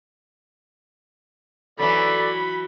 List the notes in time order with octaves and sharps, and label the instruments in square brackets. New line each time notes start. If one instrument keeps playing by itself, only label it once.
[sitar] E3 F#3 [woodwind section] A4 D5 [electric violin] B5